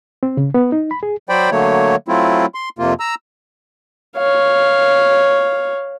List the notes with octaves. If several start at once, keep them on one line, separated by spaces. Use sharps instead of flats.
C4
C#3
B3
D#4
B5
G#4
F#3 C5 D5 G5 B5
D3 F#3 A3 A#3 C#5
F#3 A3 C4 E4 F4
C6
F2 C3 A#3 F4
A#5 E6
C#5 F5